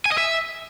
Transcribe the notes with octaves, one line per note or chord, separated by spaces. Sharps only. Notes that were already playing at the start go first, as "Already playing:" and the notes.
G#5
D#5
E5